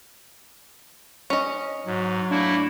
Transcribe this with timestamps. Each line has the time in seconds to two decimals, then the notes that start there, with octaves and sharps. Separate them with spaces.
1.30 C#4 D#5
1.86 G#2 F#3
2.31 A3 A#3 D4 E4